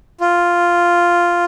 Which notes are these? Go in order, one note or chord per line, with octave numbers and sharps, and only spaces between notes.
F4